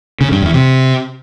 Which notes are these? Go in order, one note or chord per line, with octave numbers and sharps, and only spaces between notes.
C#3
G2
E2
C3